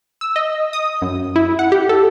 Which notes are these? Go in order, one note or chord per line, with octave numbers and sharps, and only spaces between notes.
E6
D#5
D#6
F#2
E4
F#5
G4
A4